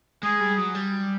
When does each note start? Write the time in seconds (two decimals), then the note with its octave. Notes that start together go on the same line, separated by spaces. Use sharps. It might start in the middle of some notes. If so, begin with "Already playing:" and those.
0.23 G#3 G#4
0.40 G3
0.58 F#3
0.75 G3